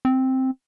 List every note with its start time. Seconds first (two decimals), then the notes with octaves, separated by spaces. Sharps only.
0.05 C4